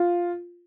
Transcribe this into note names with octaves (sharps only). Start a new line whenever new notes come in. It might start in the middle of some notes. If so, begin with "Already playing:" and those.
Already playing: F4